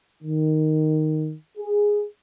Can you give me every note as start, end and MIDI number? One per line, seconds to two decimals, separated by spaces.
0.23 1.34 51
1.58 2.05 68